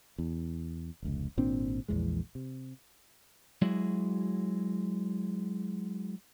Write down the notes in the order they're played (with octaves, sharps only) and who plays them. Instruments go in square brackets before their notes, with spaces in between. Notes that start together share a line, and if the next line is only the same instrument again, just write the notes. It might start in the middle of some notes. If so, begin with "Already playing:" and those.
[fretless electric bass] E2
F1 C#2
G#1 A#2 C4 D4
A#1 E2 E3 G#3
C3
[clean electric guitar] F#3 G#3 E4 F#4 G#4